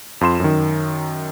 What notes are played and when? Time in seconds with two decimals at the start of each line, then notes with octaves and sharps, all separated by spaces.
0.21 F2 F4 C6 E7
0.40 F#2 D#3